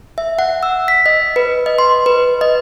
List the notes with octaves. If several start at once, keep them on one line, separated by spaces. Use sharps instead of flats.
E5
F#5
E6
B6
D#5
B4
D#5
C6
B4
D#5